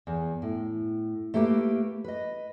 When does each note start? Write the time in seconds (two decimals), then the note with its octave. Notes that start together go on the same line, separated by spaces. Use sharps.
0.07 E2
0.42 A2
1.34 A3 A#3 G4 B4
2.04 B4 D#5